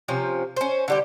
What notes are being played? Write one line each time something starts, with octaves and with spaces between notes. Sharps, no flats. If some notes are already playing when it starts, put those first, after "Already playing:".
C3 F3 C#4
C#4 C5
D3 G3 G4